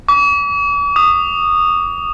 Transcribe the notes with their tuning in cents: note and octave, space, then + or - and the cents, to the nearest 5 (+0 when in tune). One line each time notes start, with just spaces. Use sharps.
D6 -45
D#6 -15